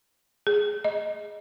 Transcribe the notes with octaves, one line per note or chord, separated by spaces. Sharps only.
G#4
D#5